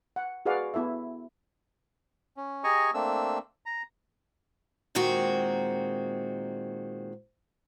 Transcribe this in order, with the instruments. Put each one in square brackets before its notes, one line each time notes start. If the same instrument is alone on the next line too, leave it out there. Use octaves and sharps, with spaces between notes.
[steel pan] F#5
F#4 G#4 B4 D5 F5 F#5
B3 E4 A4 E5
[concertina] C#4
G4 G#4 D#5 G#5 A#5 C#6
A3 A#3 C4 D4 E6
A#5
[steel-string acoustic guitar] A#2 D#3 G#3 C4 F#4